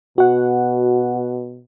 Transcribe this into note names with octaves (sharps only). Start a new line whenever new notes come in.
B2 F#4 F#5